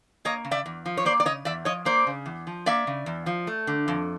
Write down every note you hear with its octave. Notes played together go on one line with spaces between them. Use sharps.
A#3 C#5 D#5
C#3
D5 E5
E2
F3
C#5
A#3 C5 D5
D5
C#3 C#5 D#5
E2 D5 E5
F3 C#5 D#5
A#3 C5 D5
C#3
E2
F3
A#3 D5 E5
C#3
E2
F3
A3
D3
F2